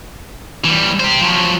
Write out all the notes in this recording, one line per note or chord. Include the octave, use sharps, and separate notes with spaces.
E3 G3
G4 C5
F3 F#3